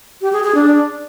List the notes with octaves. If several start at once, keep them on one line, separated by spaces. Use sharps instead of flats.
G4
G#4
G#4
D4